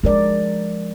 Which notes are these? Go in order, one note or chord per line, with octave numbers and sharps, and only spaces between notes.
F3 G#3 A#4 D5